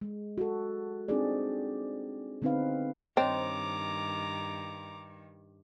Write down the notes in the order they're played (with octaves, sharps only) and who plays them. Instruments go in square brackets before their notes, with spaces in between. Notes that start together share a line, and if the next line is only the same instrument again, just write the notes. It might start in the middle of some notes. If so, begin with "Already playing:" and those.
[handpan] G#3
F#4 A4
C4 D4 D#4 G4 G#4 D5
D3 B3 C4 D#4 B4 F5
[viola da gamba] G2 D#3 [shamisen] C4 [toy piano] C5 C#5 D#5 [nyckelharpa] A#5 D6